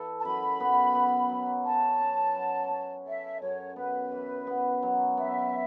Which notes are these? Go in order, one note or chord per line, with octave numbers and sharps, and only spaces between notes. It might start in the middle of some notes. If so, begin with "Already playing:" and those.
Already playing: E3 E4 A4
A5
F#2 B5
B3
B3
F#3
C#4 A5
C#4
F#3
C#4
A4 E5
F#2 C#5
B3 B4
E3
B3
F#3
B3 E5